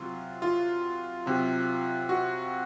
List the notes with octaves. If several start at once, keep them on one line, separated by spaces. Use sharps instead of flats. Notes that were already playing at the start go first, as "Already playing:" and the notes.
Already playing: C3 F#3 F4
F4
C3 F#3
F#4